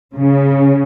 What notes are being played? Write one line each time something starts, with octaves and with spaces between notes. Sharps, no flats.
C#3